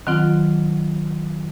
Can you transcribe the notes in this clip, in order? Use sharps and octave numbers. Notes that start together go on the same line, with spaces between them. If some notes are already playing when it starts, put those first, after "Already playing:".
D#3 F#3 C4 F4